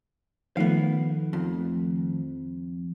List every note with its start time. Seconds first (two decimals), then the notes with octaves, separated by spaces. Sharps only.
0.57 D#3 F3 A3 B3 F5
1.33 F2